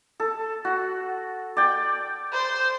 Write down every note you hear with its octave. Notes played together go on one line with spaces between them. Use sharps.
A4
F#4
D5 G5
C5